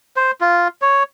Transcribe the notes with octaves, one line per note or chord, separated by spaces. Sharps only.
C5
F4
C#5